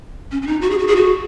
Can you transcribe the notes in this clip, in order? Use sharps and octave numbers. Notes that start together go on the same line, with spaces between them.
C#4
C#4
D#4
F#4
G#4
F#4
G#4
F#4